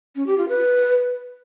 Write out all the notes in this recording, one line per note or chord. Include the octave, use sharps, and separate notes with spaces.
C#4
G4
F4
B4